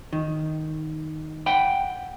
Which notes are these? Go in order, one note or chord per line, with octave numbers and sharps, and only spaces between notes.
D#3
F#5 G5 B5